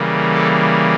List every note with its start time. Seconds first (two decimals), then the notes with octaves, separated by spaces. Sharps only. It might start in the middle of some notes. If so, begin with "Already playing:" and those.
Already playing: C#3 E3 G3 A#3
0.34 A4